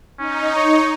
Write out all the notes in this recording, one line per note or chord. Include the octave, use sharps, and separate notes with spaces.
C#4 D#4
C#5